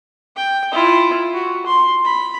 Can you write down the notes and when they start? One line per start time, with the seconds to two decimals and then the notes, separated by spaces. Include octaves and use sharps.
0.37 G5
0.72 E4 F4
1.34 F#4
1.66 C6
2.05 B5